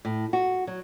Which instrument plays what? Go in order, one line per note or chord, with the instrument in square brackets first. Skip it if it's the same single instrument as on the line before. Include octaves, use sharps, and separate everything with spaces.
[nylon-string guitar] A2
F#4
F#3